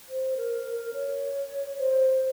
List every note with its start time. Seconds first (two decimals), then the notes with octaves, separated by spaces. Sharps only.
0.09 C5
0.37 A#4
0.66 A#4
0.94 C#5
1.78 C5